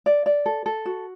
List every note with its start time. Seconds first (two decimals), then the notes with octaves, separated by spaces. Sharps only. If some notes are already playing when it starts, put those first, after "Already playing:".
0.06 D5
0.26 D5
0.46 A4
0.66 A4
0.86 F#4